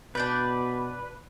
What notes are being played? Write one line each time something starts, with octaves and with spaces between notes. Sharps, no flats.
B2 D4 B4 D5 G6